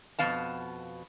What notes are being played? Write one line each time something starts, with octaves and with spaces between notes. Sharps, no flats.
F2 B2 B3 F5 A5